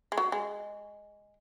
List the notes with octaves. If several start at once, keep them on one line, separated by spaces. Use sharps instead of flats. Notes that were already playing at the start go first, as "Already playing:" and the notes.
G#3
F#3
G#3